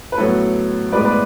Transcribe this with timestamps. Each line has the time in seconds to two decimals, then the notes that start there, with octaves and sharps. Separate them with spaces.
0.12 B4
0.18 A2 F#3 B3 A4 C#5
0.92 A2 G#3 B3 B4 D5
1.05 B4 D5